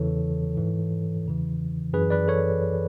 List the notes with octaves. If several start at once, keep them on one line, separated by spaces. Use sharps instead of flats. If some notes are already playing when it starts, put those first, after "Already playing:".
Already playing: E2 C#3 E3 A4 C#5
G#2 E3
E2 C#3 E3
F#2 E3 G#4 B4
B4 D5
A4 C#5